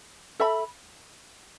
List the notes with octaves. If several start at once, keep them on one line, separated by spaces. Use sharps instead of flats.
A4 E5 B5